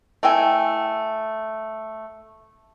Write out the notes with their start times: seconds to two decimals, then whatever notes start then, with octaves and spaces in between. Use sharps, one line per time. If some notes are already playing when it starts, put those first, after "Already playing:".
0.23 A3 E4 G5 G#5